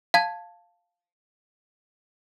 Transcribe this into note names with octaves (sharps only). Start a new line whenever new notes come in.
F5 A5 G#6